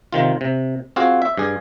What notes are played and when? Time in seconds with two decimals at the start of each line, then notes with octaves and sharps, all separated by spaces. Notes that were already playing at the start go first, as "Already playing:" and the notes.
0.13 C3 D#3 F4
0.41 C3
0.96 C4 F4 F#4 G#4 F5
1.22 E5
1.37 G2 G#4